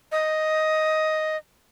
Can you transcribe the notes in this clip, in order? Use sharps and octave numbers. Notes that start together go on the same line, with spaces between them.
D#5